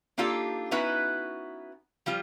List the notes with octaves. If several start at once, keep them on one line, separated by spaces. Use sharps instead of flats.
A#3 D4 D#4 F4 G4 A4
B3 C#4 D#4 E4 F#4 B4
F3 G3 F4